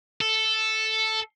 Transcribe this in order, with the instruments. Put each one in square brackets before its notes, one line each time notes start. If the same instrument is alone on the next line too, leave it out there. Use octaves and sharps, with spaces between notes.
[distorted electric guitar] A4